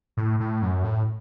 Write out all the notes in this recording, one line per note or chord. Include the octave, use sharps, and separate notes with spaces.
A2
A2
F#2
A2